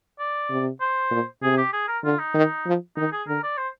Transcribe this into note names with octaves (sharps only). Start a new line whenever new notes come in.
D5
C3
C5
A#2
C3 G#4
G4
G#4
A#4
D3 F4
D#4
D#3
F3
D#3 D#4
G#4
D3 A#4
D5
C5